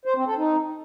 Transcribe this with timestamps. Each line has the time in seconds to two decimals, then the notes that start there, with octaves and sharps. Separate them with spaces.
0.06 C5
0.16 C4
0.27 A4
0.37 D#4